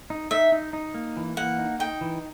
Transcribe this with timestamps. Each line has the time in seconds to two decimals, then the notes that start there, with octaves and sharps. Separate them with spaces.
0.10 D#4
0.31 D#4 E5
0.52 D#4
0.73 D#4
0.94 A#3
1.17 E3
1.37 A#3 F#5
1.59 D#4
1.79 D#4 G5
2.01 E3